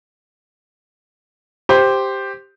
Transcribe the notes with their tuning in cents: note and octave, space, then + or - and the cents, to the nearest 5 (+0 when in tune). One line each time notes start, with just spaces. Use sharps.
G4 +0 C5 +0